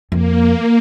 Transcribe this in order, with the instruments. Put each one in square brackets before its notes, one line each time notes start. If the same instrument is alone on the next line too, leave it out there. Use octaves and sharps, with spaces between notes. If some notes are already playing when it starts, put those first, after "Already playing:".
[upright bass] F2 [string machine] A#3